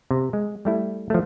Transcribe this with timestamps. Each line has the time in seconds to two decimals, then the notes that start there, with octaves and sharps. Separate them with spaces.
0.11 C3
0.33 G#3
0.65 G3 A3 E4
1.10 F3 F#3 A3